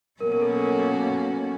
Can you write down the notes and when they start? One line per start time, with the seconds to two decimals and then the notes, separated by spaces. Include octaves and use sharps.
0.20 B2 F#3 A#3 C#4 F#4 A#4
0.32 A#4
0.41 A4
0.62 A#4